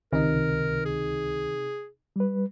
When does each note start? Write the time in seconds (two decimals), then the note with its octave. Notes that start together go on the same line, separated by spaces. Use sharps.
0.13 C#2 C3 D#3 D#4 A#4
0.85 G#4
2.16 G3 B4